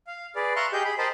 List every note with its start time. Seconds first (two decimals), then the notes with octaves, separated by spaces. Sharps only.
0.07 F5
0.36 G#4 B4 D5
0.56 E5 F5 A#5 C6 C#6 F#6
0.73 G4 G#4 D#5 G5 G6
0.85 G#4 B5
0.98 A#4 C5 D#5 G5 A5 B5